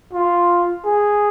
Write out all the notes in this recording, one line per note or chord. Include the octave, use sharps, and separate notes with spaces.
F4
G#4